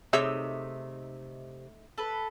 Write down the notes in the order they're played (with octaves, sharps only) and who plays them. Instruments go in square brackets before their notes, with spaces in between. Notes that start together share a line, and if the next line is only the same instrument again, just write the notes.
[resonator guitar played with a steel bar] C3 [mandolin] A3 D#4 E6 [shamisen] G#4 C#5 E5
[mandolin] A4 B4